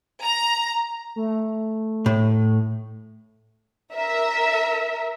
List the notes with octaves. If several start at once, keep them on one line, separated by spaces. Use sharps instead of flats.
A#5
A3
A2
A#4 E5